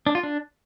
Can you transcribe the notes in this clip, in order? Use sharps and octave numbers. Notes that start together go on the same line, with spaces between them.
D4
F4
D4